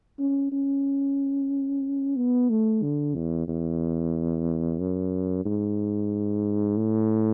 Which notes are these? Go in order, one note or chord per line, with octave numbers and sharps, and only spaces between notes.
C#4
C#4
B3
A3
D3
E2
E2
F#2
G#2
A2